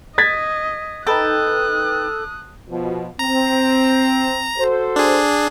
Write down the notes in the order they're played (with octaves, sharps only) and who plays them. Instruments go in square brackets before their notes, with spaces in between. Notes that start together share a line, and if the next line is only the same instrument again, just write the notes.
[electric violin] D#5 [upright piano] G#6 A6 B6
[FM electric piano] D#4 B4 G5 [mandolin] A4 [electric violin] D#6 F#6
[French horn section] B2 F3
[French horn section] C4 [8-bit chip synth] A#5
[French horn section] F#4 A4 C5
[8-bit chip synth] D4 G#4